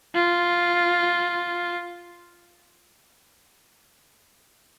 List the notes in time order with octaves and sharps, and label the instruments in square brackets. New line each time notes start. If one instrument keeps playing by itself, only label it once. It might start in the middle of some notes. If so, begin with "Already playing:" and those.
[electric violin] F4